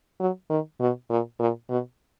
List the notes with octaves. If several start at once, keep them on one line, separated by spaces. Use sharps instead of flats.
F#3
D#3
B2
A#2
A#2
B2